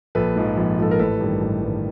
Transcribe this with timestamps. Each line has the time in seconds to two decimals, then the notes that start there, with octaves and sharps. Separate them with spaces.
0.15 A#1 A4 B4
0.36 G#2 F3
0.57 A#1
0.78 G#2 F3 A4
0.91 A#4
0.99 A1 A4 B4
1.21 G2 D#3
1.41 A1
1.62 G2 D#3